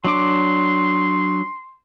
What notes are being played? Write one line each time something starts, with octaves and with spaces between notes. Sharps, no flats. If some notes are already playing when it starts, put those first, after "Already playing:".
F#3 D4 C6 D6